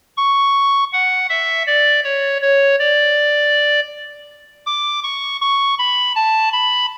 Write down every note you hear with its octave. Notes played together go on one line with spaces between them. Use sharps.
C#6
F#5
E5
D5
C#5
C#5
D5
D6
C#6
C#6
B5
A5
B5